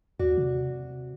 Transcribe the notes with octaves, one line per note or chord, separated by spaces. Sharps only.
D#2 F#4 D5
C3